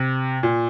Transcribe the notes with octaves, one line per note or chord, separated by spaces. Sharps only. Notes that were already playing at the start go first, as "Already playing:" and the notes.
Already playing: C3
A#2